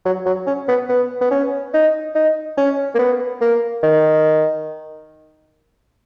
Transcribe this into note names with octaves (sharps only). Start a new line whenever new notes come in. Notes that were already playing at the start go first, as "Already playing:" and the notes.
F#3
F#3
C#4
B3
B3
B3
C#4
D#4
D#4
C#4
A#3
B3
A#3
D#3